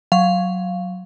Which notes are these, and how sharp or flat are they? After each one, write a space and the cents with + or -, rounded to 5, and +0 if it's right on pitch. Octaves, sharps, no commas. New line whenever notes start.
F#3 +0 F5 +0